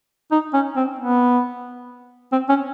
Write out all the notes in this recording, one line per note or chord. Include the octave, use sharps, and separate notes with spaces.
D#4
C#4
C4
B3
C4
C#4